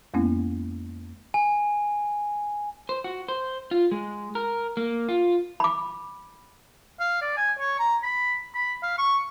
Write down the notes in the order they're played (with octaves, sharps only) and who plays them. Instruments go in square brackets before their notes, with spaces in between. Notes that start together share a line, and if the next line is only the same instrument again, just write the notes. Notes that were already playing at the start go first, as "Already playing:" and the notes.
[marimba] F2 G#3 A#3 B3 C#4 E4
[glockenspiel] G#5
[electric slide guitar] C5
F#4
C5
F4
G#3
A#4
A#3
F4
[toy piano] B5 D6
[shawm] F5
D5
G#5
C#5
A#5
B5
B5
F5
C#6